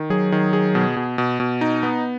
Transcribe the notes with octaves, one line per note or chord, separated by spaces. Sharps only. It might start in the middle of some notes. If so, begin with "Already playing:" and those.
Already playing: D#3
F#3 G#4
D#3
G#4
B2
B2
B2
B2
D#4
B3